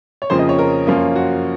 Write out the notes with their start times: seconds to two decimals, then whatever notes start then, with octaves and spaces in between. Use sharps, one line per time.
0.22 C#5
0.30 F2 C#3 F3 A#3 C5
0.39 D#5
0.49 C#5
0.59 A#4
0.87 F#2 F3 A#3 C#4 F4
1.16 F#4